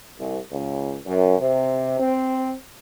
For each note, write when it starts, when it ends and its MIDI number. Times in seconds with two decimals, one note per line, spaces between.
0.19 0.38 36
0.51 0.95 37
1.06 1.38 42
1.39 2.00 48
2.00 2.54 60